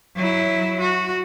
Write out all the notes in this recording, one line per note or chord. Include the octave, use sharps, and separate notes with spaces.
F#3 E4
F#4